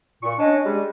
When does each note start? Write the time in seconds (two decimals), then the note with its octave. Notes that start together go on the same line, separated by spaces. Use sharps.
0.23 A#2 C#6
0.38 C#4 D4 D#5
0.64 G3 G#3 G#4